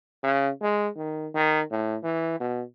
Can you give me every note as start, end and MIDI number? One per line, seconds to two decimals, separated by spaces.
0.23 0.50 49
0.62 0.88 56
0.96 1.27 51
1.34 1.61 51
1.71 1.96 45
2.03 2.38 52
2.40 2.63 47